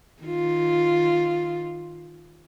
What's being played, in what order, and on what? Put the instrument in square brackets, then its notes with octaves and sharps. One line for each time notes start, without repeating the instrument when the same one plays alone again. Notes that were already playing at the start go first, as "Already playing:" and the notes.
[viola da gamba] D#3 F4